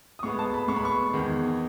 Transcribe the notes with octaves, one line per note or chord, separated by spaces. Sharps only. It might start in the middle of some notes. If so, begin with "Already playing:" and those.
D#6
A2 G#3 B3 C#6
A5
B5
A2 G#3 B3 C#6
B5
C#6
E2 D#3 G#3